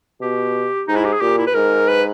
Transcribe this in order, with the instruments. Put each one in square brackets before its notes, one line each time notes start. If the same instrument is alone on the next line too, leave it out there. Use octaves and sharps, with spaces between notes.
[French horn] B2 [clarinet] G4
[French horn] G#2 [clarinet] D#4
[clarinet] E4
G4
G#4
[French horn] A#2 [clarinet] G4
[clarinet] E4
B4
[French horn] G#2 [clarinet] A#4
[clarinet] B4